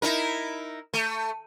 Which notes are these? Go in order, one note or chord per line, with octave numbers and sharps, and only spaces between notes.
D#4 E4 A#4
A3